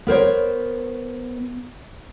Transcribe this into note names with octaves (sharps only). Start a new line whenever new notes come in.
B3 A#4 C5 C#5